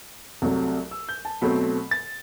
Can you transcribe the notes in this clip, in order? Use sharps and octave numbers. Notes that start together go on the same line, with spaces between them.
C2 C3 F#3 A3
E6
G6
A5
B2 F#3 A3 C4 B5
A6